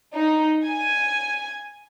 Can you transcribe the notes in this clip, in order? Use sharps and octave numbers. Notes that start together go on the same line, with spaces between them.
D#4
G#5